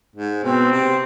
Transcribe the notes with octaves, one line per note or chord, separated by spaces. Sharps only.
G#2
B2 C4
C3